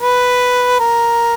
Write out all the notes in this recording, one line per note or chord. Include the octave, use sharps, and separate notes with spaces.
B4
A#4